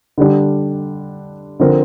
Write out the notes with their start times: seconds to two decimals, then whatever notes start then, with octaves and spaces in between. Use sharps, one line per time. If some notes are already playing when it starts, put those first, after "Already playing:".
0.18 D3 G3 D4
1.60 D3 F3 C4 A#4